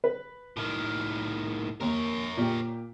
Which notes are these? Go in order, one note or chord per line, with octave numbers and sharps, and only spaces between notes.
B4
A2 D#3
D#2 A#4 C#5
A#2 G4